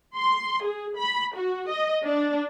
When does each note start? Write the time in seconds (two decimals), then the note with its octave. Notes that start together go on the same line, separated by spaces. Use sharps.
0.16 C6
0.63 G#4
0.96 B5
1.35 F#4
1.69 D#5
2.03 D4